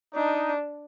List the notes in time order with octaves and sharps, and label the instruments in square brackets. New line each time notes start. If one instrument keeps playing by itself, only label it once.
[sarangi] D4 [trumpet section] D#4